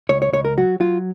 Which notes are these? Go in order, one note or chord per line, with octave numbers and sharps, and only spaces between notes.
C#2 C#5
C#5
C#2 C#5
A#4
F#3 F#4
F#3 F4